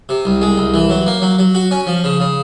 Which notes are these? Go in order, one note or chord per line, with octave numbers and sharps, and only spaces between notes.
C3
C2
G#3
C2
E3
F#3
A#3
F#3
F#3
F#4
C#4
F3
C#3
C#3